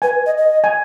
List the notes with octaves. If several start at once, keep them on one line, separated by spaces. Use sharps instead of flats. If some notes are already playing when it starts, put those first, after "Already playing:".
B4 G#5
D#5
D#5
G#5